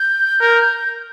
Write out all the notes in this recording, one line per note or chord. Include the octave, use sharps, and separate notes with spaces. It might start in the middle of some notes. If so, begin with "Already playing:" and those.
Already playing: G6
A#4